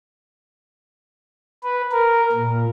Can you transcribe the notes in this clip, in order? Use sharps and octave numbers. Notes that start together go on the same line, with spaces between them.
B4
A#4
A#2